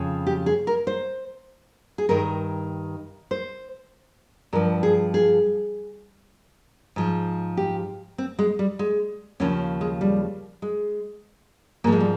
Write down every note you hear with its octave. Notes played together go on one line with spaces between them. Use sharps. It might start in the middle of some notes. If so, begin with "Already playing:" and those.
Already playing: F2 C#3 F3
G4
G#4
A#4
C5
G#4
G2 D#3 A#4
C5
G2 F3 A#4
G#4
G#4
G#2 F3
G4
C4
G#3
G3
G#3
D#2 C#3 F3 C#4
G#3
G3
G#3
G#2 F3 A#3
G#3
G3